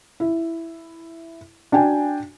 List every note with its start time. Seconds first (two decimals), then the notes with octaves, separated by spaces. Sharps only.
0.20 E4
1.72 D4 F#4 G5 G#5